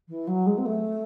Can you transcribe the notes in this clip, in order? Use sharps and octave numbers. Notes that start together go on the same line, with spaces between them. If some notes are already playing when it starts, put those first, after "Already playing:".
E3
F#3
G#3
C4
A3